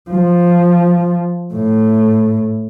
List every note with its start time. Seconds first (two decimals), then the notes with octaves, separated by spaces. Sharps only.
0.10 F3
1.54 A2